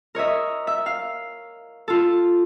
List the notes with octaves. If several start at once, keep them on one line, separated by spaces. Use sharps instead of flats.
A#4 C#5 D#5 E5
E5
F5
F4 A4